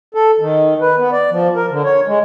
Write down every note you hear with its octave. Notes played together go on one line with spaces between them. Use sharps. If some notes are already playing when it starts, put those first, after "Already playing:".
A4
D#3
B4
B3
D5
F3
A#4
D3
C#5
G#3